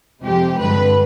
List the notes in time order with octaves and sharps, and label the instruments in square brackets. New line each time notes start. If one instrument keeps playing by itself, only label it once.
[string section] F2 C3 F3 G#3 G4
G2 D3 G#3 B4